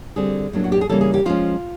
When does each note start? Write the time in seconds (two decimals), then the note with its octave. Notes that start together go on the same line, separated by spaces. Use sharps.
0.16 D3 G3 C4 G#4
0.53 A2 F#3 A#3 D4
0.64 F#4
0.72 G4
0.81 G#4
0.89 C#3 E3 G3 A#3 C#4 A4
1.01 G#4
1.14 G4
1.25 F3 G#3 C#4 F4